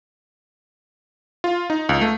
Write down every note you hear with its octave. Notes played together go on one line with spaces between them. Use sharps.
F4
D#4
C#2
A3